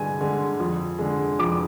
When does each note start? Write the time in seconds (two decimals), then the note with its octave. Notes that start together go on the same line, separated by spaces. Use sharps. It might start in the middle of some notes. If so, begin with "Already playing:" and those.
Already playing: G2 D3 G#3 G#5
0.21 D3 G#3
0.60 F2
0.99 D3 G#3
1.39 F2 D6